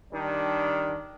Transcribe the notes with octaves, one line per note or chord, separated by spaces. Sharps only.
D#3 G3 D4